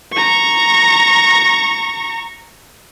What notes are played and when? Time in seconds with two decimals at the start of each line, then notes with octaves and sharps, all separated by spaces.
0.13 A#5 C#6